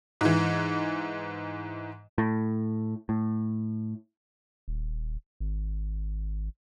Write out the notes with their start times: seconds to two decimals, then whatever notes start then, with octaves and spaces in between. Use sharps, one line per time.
0.21 G#2 E3
2.18 A2
3.09 A2
4.68 D#1
5.40 G#1